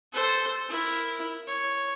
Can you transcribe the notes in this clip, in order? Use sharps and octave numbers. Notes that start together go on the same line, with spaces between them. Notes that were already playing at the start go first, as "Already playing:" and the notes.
A4 C5
E4 A#4
C#5